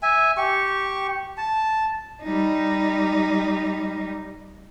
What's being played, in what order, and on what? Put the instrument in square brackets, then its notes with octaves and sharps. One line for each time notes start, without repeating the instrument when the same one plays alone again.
[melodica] E5 G#5
G4 C#6
A5
[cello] G3 D#4